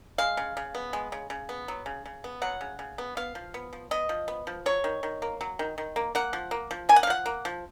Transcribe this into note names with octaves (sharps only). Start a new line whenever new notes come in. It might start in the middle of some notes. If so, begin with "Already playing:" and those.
G#3 F5
C#3
C#3
B3
G#3
C#3
C#3
B3
F#3
C#3
C#3
B3
F#3 F#5
C#3
C#3
B3
B3 F5
F3
B3
F3
B3 D#5
F3
B3
F3
F#3 C#5
D#3
D#3
A#3
F#3
D#3
D#3
A#3
A#3 F#5
F3
A#3
F3
A#3 G#5
F#5
F5
F3 F#5
A#3
F3